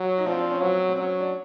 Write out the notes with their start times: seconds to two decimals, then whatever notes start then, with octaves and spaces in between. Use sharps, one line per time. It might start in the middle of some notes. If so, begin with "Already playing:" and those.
Already playing: F#3
0.18 D#4
0.26 F3 C4 D4
0.39 D4
0.51 C#4
0.61 F#3 C4
0.89 C4
0.96 F#3 C#4
1.20 D4